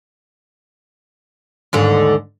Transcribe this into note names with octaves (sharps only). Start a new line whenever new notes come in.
D#2 G#2 D3